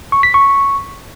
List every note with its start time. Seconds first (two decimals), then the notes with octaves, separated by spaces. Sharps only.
0.12 C#6
0.23 B6
0.34 C#6